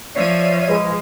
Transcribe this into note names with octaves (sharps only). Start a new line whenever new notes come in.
F3 C#5 D5 E5 D#7
G#3 G#4 B4 D#5